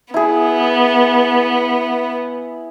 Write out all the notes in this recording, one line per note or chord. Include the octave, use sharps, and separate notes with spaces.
B3 E4 G#4